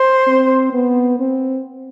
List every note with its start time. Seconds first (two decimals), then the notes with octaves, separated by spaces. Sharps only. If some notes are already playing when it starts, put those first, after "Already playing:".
Already playing: C5
0.27 C4
0.73 B3
1.20 C4